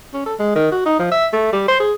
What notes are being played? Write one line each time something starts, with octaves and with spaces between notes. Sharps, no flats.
C#4
A4
G#3
D#3
F#4
D#4
F3
E5
A3
G3
C5
G#4